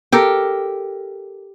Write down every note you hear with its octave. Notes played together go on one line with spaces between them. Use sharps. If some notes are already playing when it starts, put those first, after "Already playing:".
G4 A4 A#4